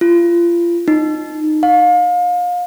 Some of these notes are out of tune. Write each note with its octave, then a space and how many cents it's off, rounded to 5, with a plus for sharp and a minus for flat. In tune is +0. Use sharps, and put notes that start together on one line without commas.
F4 -30
D#4 -15
F5 +35